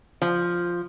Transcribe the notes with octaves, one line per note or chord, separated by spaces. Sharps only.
F3